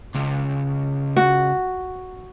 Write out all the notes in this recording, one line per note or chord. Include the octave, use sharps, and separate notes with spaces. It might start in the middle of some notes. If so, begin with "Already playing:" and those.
C#2
F#4